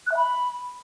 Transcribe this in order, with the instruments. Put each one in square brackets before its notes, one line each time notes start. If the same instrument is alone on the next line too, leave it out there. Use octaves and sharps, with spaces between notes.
[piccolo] F#6
E5
B5